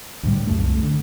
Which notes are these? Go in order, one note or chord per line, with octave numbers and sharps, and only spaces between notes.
D2 A2 G3
C2 F#2 A3
D3